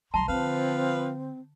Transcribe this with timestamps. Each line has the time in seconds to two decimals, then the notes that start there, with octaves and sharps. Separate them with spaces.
0.14 B1 F#3 A5 A#5 C6
0.28 D3 F3 C4 B4 F5